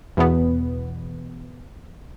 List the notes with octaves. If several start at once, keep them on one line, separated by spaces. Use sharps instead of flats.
E2 B2 B3